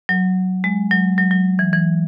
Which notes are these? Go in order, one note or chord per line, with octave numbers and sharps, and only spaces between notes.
F#3
G#3
F#3
F#3
F#3
E3
E3